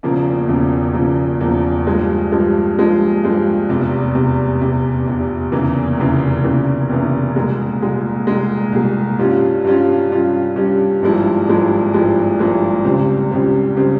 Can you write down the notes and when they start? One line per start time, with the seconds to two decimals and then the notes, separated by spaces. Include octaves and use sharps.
0.03 E1 E2 C#3 F3 A#3
0.48 E1 E2 C#3 F3 A#3
0.94 E1 E2 C#3 F3 A#3
1.40 E1 E2 C#3 F3 A#3
1.87 G2 F3 G#3
2.31 G2 F3 G#3
2.78 G2 F3 G#3
3.23 G2 F3 G#3
3.69 F1 E2 C3
4.14 F1 E2 C3
4.61 F1 E2 C3
5.06 F1 E2 C3
5.52 F1 E2 C#3 E3 A#3
5.98 F1 E2 C#3 E3 A#3
6.44 F1 E2 C#3 E3 A#3
6.89 F1 E2 C#3 E3 A#3
7.36 C2 A#2 G#3
7.81 C2 A#2 G#3
8.27 C2 A#2 G#3
8.73 C2 A#2 G#3
9.18 G2 G3 C#4 F4
9.64 G2 G3 C#4 F4
10.10 G2 G3 C#4 F4
10.56 G2 G3 C#4 F4
11.02 G#1 G2 F3 G#3 E4
11.47 G#1 G2 F3 G#3 E4
11.93 G#1 G2 F3 G#3 E4
12.39 G#1 G2 F3 G#3 E4
12.85 C#2 C#3 G3 C4
13.31 C#2 C#3 G3 C4
13.77 C#3 G3 C4